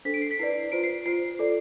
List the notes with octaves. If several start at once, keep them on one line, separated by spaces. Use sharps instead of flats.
D4 A4 C5 B6
D7
C7
B6
E4 B4 D5 C7
F4 C5 D7
C7
F4 C5 C7
F4 A4 D5